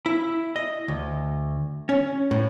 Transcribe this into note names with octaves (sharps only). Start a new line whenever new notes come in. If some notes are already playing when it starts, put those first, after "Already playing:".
E4
D#5
D2
C#4
A2